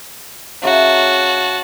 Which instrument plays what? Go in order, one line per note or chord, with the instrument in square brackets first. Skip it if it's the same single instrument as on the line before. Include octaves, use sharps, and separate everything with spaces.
[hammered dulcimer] C#3 E5 A#5 [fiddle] F#4 A5